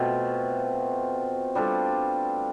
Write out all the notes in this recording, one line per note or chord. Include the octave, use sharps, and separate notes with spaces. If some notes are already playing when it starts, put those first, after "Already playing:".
Already playing: B2 A3 C4 F4
G3 D4 F4 A4